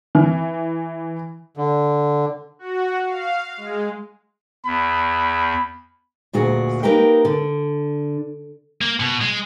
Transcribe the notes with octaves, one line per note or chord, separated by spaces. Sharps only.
E3
D3
F#4
F5
G#3
E2 B5
D2 A#2 F#4 G#4
A#3 D#4 G4 A#4 B4 G5
D3
A#3
B2
G#3